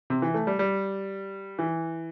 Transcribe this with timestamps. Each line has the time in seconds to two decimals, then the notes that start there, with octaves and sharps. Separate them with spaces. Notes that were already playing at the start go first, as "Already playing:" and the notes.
0.10 C3
0.22 E3
0.34 A3
0.47 G3
0.59 G3
1.59 E3